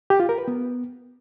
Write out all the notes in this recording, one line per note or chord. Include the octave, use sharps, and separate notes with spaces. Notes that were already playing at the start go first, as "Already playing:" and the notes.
G4
F4
A#4
B4
B3